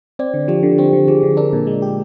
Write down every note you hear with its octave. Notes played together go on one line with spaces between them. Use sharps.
C4 D5
D3
F3 G4
D3
C4 G4
D3
F3 G#4
D3
D4 A#4
A#2
G#3
G4